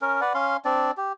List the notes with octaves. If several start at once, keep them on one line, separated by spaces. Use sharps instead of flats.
C#4 A#4
B4 D5 F#5
C#4 F5 C6
C4 D4 D5
G4